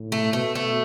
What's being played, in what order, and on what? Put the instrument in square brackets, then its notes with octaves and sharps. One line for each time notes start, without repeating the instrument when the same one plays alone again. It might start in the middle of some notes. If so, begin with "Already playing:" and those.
Already playing: [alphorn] A2
[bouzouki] A3
[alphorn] B2 [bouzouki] A3
[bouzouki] A3